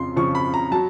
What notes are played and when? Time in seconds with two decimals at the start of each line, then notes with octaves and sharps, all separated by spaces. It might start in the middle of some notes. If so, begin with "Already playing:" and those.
Already playing: F2 C#3 F3 C6
0.16 F2 C#3 F3 C#6
0.35 B5
0.54 A#5
0.72 F#3 A5